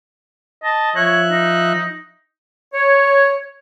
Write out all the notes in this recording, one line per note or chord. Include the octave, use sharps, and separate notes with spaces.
D#5 A5
F3 C#5 E5 F#6
D#4
C#5